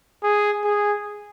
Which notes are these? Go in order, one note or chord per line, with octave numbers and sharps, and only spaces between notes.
G#4
G#4